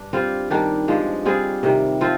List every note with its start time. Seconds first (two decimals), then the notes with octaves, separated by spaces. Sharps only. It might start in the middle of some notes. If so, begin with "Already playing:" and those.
Already playing: G2 D4
0.13 G3 C4 F4
0.50 D#3 G3 D4 G4
0.88 G2 F3 G#3
1.25 G3 C4 F4 G#4
1.63 C3 D#3 G3
2.01 F3 C4 F4